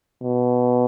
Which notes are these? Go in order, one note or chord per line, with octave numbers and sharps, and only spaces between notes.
B2